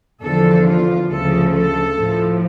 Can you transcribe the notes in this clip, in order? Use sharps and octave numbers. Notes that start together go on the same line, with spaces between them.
E2 D3 F3 A4
F4
D2 C#3 F3 A4
A4
A2 F3